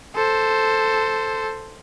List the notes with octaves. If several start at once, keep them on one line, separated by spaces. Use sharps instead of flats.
A4 C5